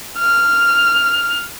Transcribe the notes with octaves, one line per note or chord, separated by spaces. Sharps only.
F6